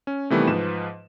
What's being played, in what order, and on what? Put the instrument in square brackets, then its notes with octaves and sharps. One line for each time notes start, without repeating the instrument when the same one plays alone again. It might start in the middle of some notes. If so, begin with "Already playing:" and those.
[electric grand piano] C#4
C3 D#3 E3 G3 A3 B3
G#2 F3 B4 E7